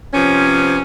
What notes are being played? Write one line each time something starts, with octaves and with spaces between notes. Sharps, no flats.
C3 F3 B3 C#4